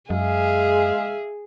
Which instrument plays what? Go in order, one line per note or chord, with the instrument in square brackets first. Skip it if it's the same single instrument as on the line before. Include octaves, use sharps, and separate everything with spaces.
[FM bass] F#2 [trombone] G#3 [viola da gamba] G#4 [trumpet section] E5 F5